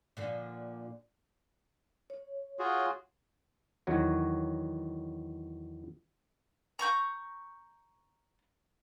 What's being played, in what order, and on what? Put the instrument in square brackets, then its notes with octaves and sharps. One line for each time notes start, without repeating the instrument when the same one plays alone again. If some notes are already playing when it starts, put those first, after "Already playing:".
[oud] A#2 D3 F3
[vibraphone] C#5
[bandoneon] F4 F#4 G#4
[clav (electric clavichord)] E2 D#3 F#3 F#4 C#5
[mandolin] A#5 C#6 G6